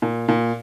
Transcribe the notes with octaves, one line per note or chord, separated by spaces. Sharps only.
A#2
A#2